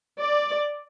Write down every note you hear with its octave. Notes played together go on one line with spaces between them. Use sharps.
D5